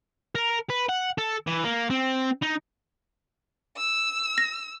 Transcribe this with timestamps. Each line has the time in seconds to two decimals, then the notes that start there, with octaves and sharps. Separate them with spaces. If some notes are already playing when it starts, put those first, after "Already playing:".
0.35 A#4
0.70 B4
0.89 F#5
1.18 A4
1.47 E3
1.64 A#3
1.90 C4
2.43 D#4
3.77 E6
4.38 A#6